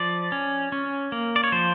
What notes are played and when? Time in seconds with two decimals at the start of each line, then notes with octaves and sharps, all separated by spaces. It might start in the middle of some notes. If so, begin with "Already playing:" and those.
Already playing: F3 D5
0.32 C#4
0.72 C#4
1.12 A#3
1.36 D5
1.44 C#5
1.52 F3 C5